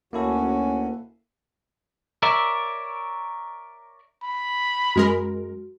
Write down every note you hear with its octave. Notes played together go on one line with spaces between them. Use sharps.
D2 A#3 C#4 E4 F#4 A4
A#4 C#5 D5 E5
B5
F#2 G#3 F#4 A#4